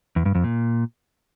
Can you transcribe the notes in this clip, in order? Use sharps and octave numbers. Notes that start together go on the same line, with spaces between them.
E2
G2
F2
A#2